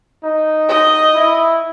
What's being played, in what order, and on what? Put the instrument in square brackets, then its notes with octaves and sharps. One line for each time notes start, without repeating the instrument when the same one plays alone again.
[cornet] D#4
[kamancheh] D#5
[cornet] E4